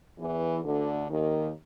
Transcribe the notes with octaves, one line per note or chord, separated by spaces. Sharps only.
E2 E3
D2 D3
D#2 D#3